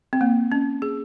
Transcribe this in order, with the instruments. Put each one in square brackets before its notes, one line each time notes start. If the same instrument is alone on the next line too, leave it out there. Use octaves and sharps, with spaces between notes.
[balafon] C4
A#3
C#4
G#4